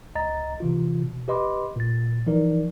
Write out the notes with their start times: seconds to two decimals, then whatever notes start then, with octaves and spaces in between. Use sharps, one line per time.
0.15 C#2 D#5 A#5 A6
0.60 C3 E3 F4
1.02 B2
1.28 G4 B4 D#5 B5 C6 D6
1.76 A#2 A6
2.26 E3 F3 D#4 A#4 D5